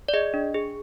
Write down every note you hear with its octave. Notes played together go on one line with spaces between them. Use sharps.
D5
G#4 D#5
D4
G#4